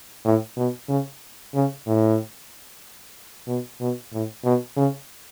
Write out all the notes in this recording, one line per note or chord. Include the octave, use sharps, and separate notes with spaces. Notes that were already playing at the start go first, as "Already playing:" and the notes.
A2
B2
C#3
C#3
A2
B2
B2
A2
B2
C#3